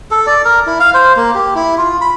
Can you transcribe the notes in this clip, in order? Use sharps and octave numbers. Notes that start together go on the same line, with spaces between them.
A4
D5
A#4
E4
F5
C5
A#3
G4
E4
F4
B5